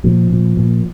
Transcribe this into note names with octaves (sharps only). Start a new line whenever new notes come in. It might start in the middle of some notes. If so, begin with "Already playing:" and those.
A#2 F3
A#2
A#2